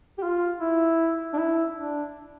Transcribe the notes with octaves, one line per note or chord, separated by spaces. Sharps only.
G4
F4
E4
D4
E4
D4